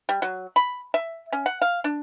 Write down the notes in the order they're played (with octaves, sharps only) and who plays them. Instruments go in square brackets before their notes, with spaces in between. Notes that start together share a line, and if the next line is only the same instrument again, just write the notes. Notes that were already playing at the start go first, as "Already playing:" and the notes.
[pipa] G3
F#3
B5
E5
C#4
F#5
F5
D4